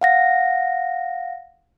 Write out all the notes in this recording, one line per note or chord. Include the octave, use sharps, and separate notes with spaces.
F5 F#5 A#6